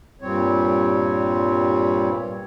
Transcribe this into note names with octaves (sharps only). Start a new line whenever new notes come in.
G2 A#2 G3 C4 C#5